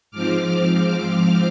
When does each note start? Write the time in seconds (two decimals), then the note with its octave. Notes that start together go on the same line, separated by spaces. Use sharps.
0.11 G#2 F3 C4 D6 F6